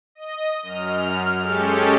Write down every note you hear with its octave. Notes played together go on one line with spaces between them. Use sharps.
D#5
F#2 F6
G#3 C#4 G4 A4